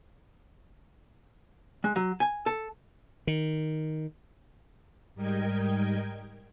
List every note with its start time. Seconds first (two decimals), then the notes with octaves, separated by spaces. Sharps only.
1.84 G#3
1.96 F#3
2.20 G#5
2.46 A4
3.27 D#3
5.15 G#2 G3 A#4 D#5 G5 G#6